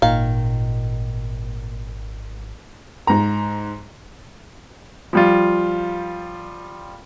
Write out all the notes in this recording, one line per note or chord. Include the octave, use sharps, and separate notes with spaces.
G#1 A#2 D#3 F5
G#2 A#5
F3 G3 F4